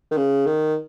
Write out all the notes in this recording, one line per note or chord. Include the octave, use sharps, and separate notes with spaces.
D#3
C#3
D#3